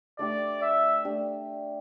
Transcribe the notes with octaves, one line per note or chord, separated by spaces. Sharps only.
A3 D4 G4 D5
E5
A3 D4 G4